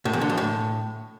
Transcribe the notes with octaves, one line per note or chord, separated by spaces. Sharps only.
A2
E2
D3
F2
A2